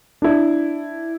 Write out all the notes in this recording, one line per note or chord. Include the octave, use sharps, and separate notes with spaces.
D4 E4